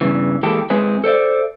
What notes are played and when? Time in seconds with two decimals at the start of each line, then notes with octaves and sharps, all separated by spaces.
0.01 E2 G2 C#3 E3
0.43 E3 G#3 A#3 G4 A4
0.70 G#3 C4 E4 G#4 B4 C#5
1.04 A4 C5 D5 E5